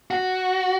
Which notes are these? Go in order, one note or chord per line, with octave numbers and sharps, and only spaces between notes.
F#4